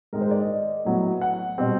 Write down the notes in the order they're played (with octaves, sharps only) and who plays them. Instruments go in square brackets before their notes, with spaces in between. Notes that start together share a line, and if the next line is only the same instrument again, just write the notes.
[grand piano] G#2 D#3 G#3 A#4
C5
D5
D#5
A2 F#3 B3
F#5
B2 G3 C4